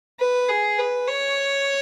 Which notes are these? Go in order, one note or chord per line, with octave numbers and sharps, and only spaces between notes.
B4
G#4
B4
C#5